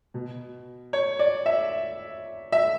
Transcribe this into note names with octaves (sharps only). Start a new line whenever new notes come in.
B2
C#5
D5
E5
E5